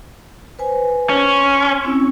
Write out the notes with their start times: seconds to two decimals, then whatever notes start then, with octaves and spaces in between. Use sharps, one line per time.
0.59 B4 C5 G#5
1.09 C#4
1.37 C6
1.83 C4 C#4 E4